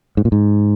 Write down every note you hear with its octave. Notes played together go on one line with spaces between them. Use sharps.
G#2
A#2
G#2